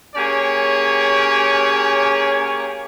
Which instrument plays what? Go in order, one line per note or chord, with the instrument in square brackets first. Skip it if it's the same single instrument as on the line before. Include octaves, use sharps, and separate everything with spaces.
[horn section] A#3 C#4 G4 G#4 C#5